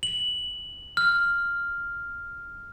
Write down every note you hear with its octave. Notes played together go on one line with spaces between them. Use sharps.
F#7
F6